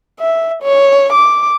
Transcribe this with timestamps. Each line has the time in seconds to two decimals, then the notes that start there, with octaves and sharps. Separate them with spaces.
0.20 E5
0.63 C#5
1.13 D6